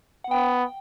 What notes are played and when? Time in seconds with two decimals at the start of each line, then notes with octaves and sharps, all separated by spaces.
0.24 F#5
0.30 B3 G5